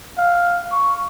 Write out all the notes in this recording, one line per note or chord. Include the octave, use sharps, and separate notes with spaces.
F5
C#6